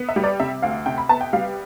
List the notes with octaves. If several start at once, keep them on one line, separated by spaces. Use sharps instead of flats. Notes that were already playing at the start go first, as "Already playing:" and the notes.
Already playing: B3
E5
G3
D5
C3 E5
D2 F5
C3 G5
B5
B3 A5
G5
G3 F5